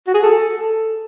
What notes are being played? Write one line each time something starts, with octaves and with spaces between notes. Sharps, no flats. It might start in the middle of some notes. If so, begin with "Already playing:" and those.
F#4
G#4
A4